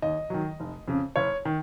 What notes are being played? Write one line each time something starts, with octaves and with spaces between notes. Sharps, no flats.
D#2 D#5
D#3 F#3
F1
F2 C#3
F#1 C#5
D#3